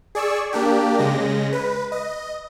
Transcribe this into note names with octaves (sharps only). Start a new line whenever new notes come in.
G#4 D5 C#6 E6
A#3 D4 G4
C#3 G#3 A#6
B4
D#5